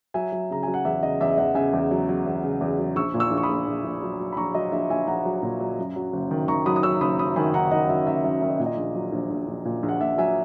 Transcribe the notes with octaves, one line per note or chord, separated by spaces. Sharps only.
F#3 E5 G#5
F#3
C#3 A#5
F#3 G#5
F#5
E2 E5
C#3 D#5
E2 E5
E2 D#5 F#5
C#3 E5 G#5
E2
F#3
F#3
E2
C#3
E2
F#3
A#1 C#6 E6
A#2
C#6 E6
A#1
C#6
B5 D#6
A#1
A#1
A#1
F#3
F#3
B5
A#1 A#5 C#6
F#3 D#5
A#1 E5
A#1 E5 G#5
A#1 F#5 A#5
F#3
A#2
F#3
F#2
F#3
F#1
D#3
D#3 A#5 C#6
F#3 B5 D#6
D#6
F#3 C#6 E6
F#1 B5 D#6
F#2 B5 D#6
D#3 G#5 B5
D#3 F#5 A#5
D#3 D#5 F#5
F#3 E5
F#2 E5
F#2 E5
D#3 E5
D#5
A#2
D#5
A#1
F#3
A#1
A#1
A#1
A#2
A#1
F#5
A#1 E5
F#3 E5 G#5